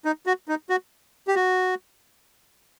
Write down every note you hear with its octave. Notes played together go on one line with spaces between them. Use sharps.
D#4
F#4
D#4
F#4
G4
F#4